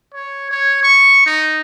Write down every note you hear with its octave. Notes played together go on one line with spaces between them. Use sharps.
C#5
C#5
C#6
D#4